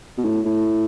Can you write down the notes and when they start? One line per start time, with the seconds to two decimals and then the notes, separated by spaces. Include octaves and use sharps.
0.18 B2
0.25 A2
0.45 A2